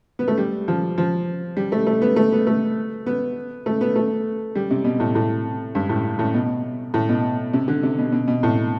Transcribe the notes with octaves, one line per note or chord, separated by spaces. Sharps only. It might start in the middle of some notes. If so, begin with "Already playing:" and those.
B3
A3
G3
F3
F3
G3
A3
A3
B3
A3
B3
A3
B3
A3
B3
A3
G3
C3
B2
A2
A2
G2
A2
A2
B2
A2
B2
C3
D3
C3
B2
B2
B2
A2